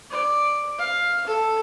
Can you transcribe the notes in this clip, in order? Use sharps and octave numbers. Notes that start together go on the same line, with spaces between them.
D5
F5
A4